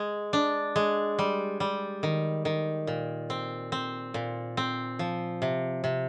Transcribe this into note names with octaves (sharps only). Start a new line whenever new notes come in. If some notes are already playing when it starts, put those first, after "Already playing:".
Already playing: G#3
D4
G#3
G3
G3
D#3
D#3
A#2
C4
C4
A#2
C4
F3
C3
C3